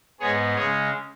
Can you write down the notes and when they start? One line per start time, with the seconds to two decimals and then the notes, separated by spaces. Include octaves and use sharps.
0.20 G#2 G#3 B3 G#4 C#5
0.55 C#3 G#3 C#4 G#4 C#5